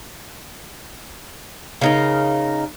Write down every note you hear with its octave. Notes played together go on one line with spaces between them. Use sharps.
C#3 D#4 A#4